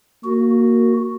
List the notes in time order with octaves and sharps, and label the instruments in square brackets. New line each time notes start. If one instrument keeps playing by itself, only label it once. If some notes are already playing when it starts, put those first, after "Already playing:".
[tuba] A#3 [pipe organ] F#4